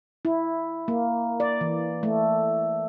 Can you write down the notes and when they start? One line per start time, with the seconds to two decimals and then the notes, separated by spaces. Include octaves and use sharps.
0.25 E4
0.88 A#3
1.40 D5
1.61 E3
2.03 A3